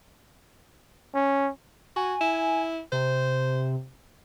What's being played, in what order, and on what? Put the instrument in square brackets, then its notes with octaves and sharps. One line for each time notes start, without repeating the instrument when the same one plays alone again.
[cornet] C#4
[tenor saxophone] F#4 [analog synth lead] G#5
[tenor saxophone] E4
[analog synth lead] C3 [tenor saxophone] C5